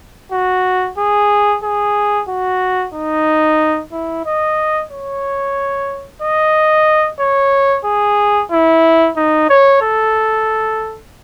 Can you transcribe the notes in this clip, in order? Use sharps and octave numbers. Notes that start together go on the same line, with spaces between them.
F#4
G#4
G#4
F#4
D#4
E4
D#5
C#5
D#5
C#5
G#4
E4
D#4
C#5
A4